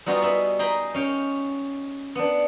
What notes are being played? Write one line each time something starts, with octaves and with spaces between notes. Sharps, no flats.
G3 B3 D#4 F4 F#4 G#4
B4 E5 B5
D#4 G#4 G5 G#5 A#5 B5
C#4 F5 G5
B3 D4